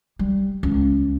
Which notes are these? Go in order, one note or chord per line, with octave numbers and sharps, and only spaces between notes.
G3
C#2